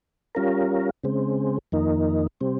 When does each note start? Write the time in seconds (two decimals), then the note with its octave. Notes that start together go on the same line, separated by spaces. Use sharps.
0.35 G3 C#4 F4 A#4
1.04 C#3 G#3 C4
1.72 F2 D#3 A#3 D#4
2.41 C3 G3 C4